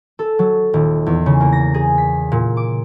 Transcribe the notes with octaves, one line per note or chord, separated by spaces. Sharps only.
A4
F#3
D#1
E2
C#3
A#3
A#6
G#4
B6
A#2
D6